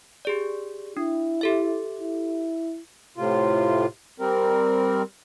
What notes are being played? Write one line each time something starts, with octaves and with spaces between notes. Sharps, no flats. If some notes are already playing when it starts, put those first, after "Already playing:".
G4 G#4 D5
D4 E4
G4 A4 E5
E4
A2 C3 F4
G3 C4 A#4